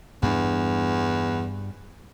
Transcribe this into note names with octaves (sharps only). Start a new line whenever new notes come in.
E2 G2 D4